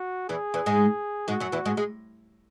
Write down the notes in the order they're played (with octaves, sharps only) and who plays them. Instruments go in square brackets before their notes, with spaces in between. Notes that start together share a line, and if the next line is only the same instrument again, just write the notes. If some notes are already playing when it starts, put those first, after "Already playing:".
Already playing: [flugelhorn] F#4
[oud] E2 E3 [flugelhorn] G#4
[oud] E2 E3
G#2 G#3
[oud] G#2 G#3 [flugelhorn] F#4
[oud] F#2 F#3
E2 E3
G#2 G#3
G#3